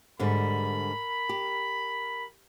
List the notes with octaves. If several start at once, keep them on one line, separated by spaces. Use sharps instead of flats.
G#2 D3 G3 A#4 B5
G4